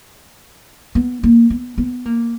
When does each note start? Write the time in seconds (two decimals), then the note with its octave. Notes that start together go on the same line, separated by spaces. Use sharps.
0.95 B3
1.23 A#3
1.50 B3
1.78 B3
2.06 A#3